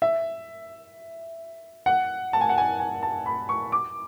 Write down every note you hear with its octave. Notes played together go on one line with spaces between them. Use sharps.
E5
F#5
A5
G#5
F#5
G#5
G#5
A5
B5
C#6
D6